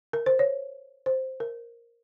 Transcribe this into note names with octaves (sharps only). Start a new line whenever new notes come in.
A#4
C5
C#5
C5
A#4